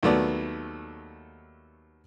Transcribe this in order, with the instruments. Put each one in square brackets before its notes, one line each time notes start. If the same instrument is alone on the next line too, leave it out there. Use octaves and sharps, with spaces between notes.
[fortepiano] D#2 F#3 A3 B3 D5